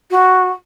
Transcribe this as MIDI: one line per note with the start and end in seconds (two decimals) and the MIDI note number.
0.11 0.49 66